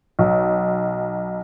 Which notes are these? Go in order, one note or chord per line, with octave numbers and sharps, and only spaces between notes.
B1